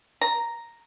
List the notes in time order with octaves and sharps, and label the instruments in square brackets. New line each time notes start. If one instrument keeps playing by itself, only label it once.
[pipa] A#5